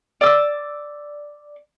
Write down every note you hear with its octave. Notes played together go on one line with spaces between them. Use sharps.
D5 E6